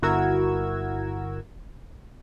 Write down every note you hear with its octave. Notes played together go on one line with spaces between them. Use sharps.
G1 E4 F#4 A#4 E6 G#6